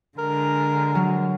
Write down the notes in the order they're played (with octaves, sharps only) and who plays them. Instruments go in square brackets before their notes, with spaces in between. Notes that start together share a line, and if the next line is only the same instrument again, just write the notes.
[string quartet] D3 G#3 [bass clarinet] A#4
[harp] F#3